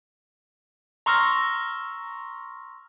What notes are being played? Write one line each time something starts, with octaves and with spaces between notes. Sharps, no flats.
A#5 C6 C#6 E6 F6 A#6